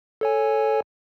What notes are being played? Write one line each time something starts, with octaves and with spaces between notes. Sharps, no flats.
A4 C#5 G#5